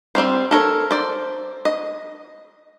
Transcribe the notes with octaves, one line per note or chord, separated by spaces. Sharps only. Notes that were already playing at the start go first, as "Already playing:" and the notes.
G3 C4 C#4 C5
A4 A#4 C#5
C5 D5
D#5